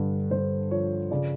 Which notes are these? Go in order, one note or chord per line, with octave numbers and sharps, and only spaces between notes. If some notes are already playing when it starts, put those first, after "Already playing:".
Already playing: G2 D3
G2 C5
F3 C#5
C#3 D5